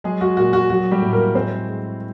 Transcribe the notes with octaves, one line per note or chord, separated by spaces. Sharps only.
F#3 G#3 G#4
F#4
A#2 F#4
F#4
F#3 F#4
G3 G4
A2
A#3 A#4
G#3 C4 C5
G#3